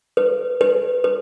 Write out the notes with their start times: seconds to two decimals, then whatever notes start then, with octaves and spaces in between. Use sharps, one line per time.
0.17 B4
0.61 B4
1.04 B4